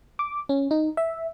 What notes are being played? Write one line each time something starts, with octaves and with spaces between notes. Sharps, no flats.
D6
C#4
D#4
E5